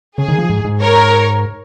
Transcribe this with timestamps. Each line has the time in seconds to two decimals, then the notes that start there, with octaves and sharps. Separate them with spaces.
0.18 C#3 G#4
0.28 D#3
0.39 F3
0.50 G#2
0.65 G#2
0.80 A#4 C#5